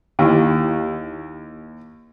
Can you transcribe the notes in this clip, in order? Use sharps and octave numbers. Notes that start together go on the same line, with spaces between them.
D#2 E4 G4